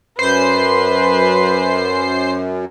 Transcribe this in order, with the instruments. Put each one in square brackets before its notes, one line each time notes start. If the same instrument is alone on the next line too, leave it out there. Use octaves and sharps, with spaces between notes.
[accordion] F#2 [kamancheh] B4 [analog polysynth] C5 C7